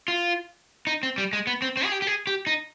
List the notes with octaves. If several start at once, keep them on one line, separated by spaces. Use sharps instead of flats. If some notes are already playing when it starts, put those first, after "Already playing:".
F4
D#4
C4
G3
G#3
B3
C4
C4
G#4
G4
G4
G#4
G4
D#4